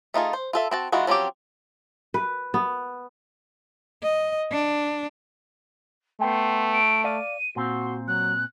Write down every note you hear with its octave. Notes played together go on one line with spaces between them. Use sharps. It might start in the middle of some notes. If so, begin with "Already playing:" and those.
A3 D#4 F4 G#4
C5
F4 A4 E5
C4 F#4 A5
D#3 E3 G#3 F4 F#4
F3 F#3 C4 C#4 G4
B4
B3
D#5
D4
A3 B3 G5 C6
D7
D5 F5 D#7
A#2 C4 F#4 C6
F#3 F#6